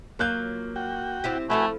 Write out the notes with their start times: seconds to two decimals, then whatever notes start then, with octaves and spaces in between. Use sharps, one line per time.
0.19 F#3 A#3 F4 F#6 G6
0.76 F#4 G5
1.24 C4 E4 G4
1.50 F3 A3 E4 F#4 A4 B4 G#5